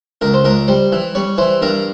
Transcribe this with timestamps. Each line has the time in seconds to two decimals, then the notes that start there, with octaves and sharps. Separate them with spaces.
0.21 C#2 A#4
0.34 C5
0.44 C#2 A#4
0.68 G3 C5
0.92 E3
1.15 G3 C#5
1.38 E3 C5
1.62 G2 A#4